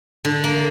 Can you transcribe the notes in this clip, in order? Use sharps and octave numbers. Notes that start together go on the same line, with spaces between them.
D3
A#3